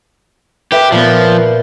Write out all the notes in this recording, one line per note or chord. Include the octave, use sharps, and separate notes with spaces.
G4 B4 E5
A#2 F3 B3